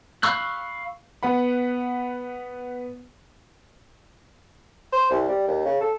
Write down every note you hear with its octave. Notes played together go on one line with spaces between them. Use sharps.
F5 B5 C#6 E6 F#6
B3 B4 F#5 B5
C5
C2
G3
D#2
C#3
A4